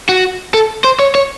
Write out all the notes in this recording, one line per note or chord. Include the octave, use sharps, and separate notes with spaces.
F#4
A4
C5
C#5
C#5